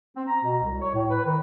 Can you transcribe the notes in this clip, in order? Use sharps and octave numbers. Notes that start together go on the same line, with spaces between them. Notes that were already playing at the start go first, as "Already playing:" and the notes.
C4
A#5
B2
C2
C#5
A2
B4
D#3